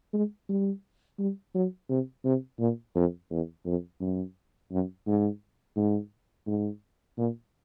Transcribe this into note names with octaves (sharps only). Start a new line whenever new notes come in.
G#3
G3
G3
F#3
C3
C3
A#2
F2
E2
F2
F#2
F#2
G#2
G#2
G#2
A#2